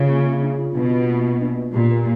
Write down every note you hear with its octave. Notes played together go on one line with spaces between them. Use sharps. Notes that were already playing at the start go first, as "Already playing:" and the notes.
Already playing: C#3 F4
A#3
G#4
D4
F4
B2 D4
F4
A#3
A#3
D4
F4
A#2 G4
A#4